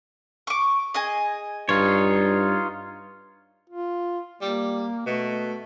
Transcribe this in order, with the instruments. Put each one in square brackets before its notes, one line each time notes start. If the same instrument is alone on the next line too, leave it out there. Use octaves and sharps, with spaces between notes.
[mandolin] C#6 D6
G#4 D#5 G#5
[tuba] G2 [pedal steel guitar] D#4 F4 C#5
[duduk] F4
[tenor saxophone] G3 [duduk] A#3
[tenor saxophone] B2 [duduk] A3